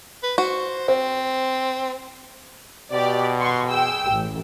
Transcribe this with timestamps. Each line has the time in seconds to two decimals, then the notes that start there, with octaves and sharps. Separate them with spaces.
0.23 B4
0.38 F#4 C5
0.88 C4 C5
2.92 B2 G4 D5
3.38 F#5 C6 C#6
3.68 G#4 G5 E6
4.11 A1